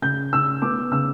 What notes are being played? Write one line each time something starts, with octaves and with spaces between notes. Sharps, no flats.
C#3 G6
C#3 E6
B3 D6
C#3 E6